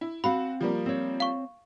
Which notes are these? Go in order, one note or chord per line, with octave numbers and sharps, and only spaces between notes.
E4
C4 F#4 F5 F#5 B5
F3 G3 A#3
C4 C#5
F5 C#6